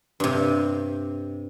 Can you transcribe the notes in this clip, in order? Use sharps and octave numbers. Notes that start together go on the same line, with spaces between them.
G2 C3